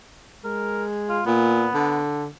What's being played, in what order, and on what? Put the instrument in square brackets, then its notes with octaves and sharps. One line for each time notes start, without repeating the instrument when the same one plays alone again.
[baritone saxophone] G#3 [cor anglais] A#4
[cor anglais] F4
[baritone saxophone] A#2 [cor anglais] B3
[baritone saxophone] D3